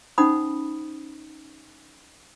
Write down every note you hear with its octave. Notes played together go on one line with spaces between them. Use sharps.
C#4 D#4 C5 F#5 B5 D#6